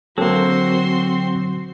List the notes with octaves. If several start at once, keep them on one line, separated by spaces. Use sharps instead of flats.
D3 F#3 A#3 C4 F#4 A4 C6